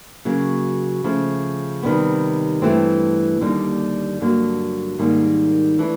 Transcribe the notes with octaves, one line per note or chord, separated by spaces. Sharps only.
C#3 F#3 A#3
C#3 F3 A3
C3 D#3 G3 B3
G2 E3 A3 C4
D#2 D3 G3 A#3 D#4
G2 D3 F#3 A#3
G#2 D#3 G3 A#3 D#4
E3 A3 D4